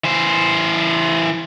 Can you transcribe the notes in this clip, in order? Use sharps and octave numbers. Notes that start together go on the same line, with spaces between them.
E3 C5